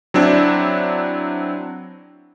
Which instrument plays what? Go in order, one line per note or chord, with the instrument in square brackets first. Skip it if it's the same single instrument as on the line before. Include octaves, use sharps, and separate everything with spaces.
[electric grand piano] F#3 C4 D4 E4